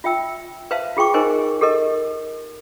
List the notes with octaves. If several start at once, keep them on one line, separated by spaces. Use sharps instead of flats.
F4 E5 G5 E6
B4 C5 E5 F5 A5
F4 G#4 G5 C#6 D6
D#4 A#4 C5 D#5 G#5
G4 A4 A#4 D#5